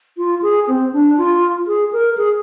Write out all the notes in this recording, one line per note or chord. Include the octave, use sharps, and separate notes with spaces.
F4
G#4
C4
D4
F4
G#4
A#4
G#4